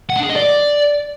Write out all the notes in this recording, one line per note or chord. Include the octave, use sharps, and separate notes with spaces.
F#5
D4
G#4
D#5
D5